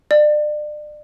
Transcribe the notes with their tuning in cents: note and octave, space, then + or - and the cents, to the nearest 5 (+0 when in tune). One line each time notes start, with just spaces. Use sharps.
D5 +35